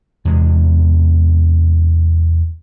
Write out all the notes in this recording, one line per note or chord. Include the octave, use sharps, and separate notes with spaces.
E2 C3 G#3